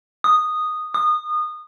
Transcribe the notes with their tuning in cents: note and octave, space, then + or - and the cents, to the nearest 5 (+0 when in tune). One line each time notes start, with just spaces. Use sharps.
D#6 -10
D#6 -25